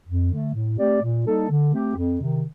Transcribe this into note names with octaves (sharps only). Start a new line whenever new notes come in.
F2
D3 A3
A2
A3 C4 G4 D5
A#2
G3 A#3 D#4 A4
D3
A3 C4 G4
F2
C3 D#3